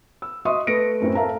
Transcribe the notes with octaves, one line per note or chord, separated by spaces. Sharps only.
E6
F#4 D#5 E5 C6 C#6 D#6
A3 B4 A#6 C#7 D7
F#2 A2 C4 E4
A4 A#4 E5 F5 A5 A#5